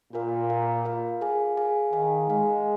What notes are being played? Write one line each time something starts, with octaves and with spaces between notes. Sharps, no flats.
A#2 F4 A#4 F5
F4 A#4 F5
F4 A#4 F5
G#4 F5 G#5
G#4 F5 G#5
D#3 G#4 F5 G#5
G#3 G#4 F5 G#5